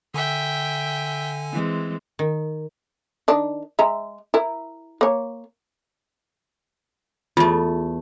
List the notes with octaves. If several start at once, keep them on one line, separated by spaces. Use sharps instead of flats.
D3 E5 G5 G#5
E3 G#3 C4
D#3
D#3 D4
G#3 E5 A#5
E4 A#4
A#3 C#5
E2 A3 F4